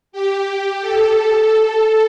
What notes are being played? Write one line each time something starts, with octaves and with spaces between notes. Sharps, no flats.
G4
A4